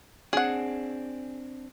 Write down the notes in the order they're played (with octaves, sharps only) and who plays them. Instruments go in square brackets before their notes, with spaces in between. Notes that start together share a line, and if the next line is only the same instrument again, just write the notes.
[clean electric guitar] C4 D4 [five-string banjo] G#4 F#5